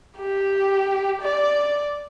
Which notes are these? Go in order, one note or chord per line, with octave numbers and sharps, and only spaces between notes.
G4
D5